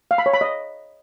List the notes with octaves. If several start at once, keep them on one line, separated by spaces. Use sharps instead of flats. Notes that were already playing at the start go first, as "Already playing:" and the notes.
F5
B5
C#5
B5
D#5